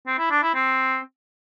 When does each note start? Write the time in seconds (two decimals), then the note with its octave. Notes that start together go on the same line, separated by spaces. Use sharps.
0.07 C4
0.19 E4
0.31 D4
0.43 E4
0.55 C4